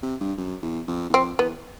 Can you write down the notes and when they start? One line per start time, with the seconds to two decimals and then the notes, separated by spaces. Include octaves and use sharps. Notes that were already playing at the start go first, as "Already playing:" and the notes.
0.03 C3
0.21 G2
0.38 F#2
0.62 E2
0.88 F2
1.10 E2
1.13 F2 C4
1.39 E2 B3